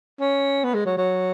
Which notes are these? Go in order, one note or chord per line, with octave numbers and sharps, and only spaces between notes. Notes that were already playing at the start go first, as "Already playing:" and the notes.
C#4
B3
G#3
F#3
F#3